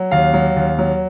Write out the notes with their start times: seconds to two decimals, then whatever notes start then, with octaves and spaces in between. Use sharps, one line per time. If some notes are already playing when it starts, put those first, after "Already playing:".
Already playing: F#3
0.11 D#2 F5
0.34 F#3
0.56 D#2
0.79 F#3